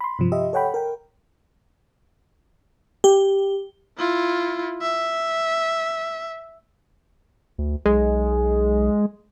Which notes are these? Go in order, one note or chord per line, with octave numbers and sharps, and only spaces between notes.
B5 C6
G2 C3 F3
G4 D#5 E5
A4 C#5 F#5 G5 B5
A#4 G5
G4
E4 F4
E5
D2
B1 G#3